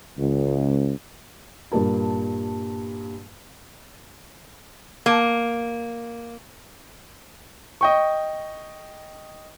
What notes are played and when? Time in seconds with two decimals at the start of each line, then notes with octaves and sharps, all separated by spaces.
0.18 C#2
1.72 G2 A#2 A#4 A5
5.06 A#3
7.81 D#5 G5 C#6